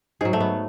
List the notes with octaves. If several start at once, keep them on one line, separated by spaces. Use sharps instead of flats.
G#2 F#3 G#4
A3
B3